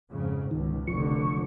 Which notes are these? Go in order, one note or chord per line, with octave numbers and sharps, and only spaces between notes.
F2 G#2 C#3
C#2 B2 D#3
F1 D3 F3 C#6